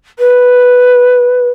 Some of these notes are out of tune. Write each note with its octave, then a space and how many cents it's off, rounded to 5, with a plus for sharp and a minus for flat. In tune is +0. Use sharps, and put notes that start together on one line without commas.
B4 +0